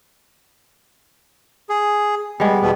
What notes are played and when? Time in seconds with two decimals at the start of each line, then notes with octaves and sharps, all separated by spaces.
1.69 G#4
2.40 G3 G#3 B3
2.62 E2 B2 B3